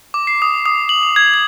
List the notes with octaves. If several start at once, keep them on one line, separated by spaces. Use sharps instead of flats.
D6
C7
D#6
D#6
F#7
F7
G#6
G#6